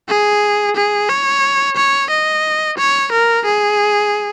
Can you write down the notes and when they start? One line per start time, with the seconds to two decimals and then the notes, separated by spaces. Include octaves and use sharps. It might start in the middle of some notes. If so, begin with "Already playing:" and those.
0.09 G#4
0.76 G#4
1.09 C#5
1.76 C#5
2.10 D#5
2.78 C#5
3.12 A#4
3.45 G#4